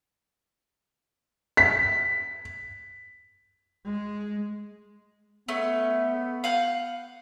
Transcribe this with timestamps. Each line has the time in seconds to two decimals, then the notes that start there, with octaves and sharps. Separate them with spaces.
1.57 B6
3.85 G#3
5.48 A3 B3 C#4
6.44 F5 F#5 G6